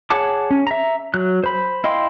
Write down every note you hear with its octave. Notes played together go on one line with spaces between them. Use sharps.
G#4 C#5 F#5 A5 D6
C#4
E5 A#5
F#3 F#6
C5 B5
E4 D#5 F5 G5 C6